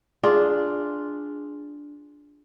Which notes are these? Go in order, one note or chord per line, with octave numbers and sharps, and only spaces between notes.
D4 F4 G#4